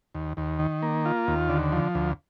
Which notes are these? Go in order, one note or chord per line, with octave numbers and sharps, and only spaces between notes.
D#2
D#2
D#3
A#3
F4
D#2
D3
F3
D2